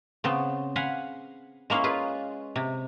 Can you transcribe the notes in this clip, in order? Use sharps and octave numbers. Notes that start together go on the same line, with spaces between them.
C#3 B3 C4
F5 F#5 G#5 B5 C6
G#3 A#3 C#4 E4 F5
F4 G#4 B4
C3